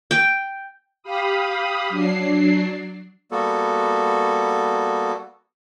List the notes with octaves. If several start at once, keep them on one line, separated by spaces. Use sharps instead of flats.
G5
G4 F5 B5 D#6
F#3 D4 C7
G3 A#3 B3 F#4 A4